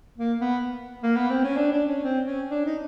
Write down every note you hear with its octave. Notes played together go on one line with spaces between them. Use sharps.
A#3
B3
A#3
B3
C4
C#4
D4
D4
C#4
C4
C#4
D4
D#4